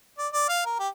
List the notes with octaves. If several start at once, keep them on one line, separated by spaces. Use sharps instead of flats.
D5
D5
F5
A#4
G4